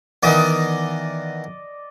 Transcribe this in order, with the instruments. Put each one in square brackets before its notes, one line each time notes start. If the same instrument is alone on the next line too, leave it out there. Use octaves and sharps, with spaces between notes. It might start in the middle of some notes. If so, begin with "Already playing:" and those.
[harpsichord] D#3 E3 B3 [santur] D5 D#5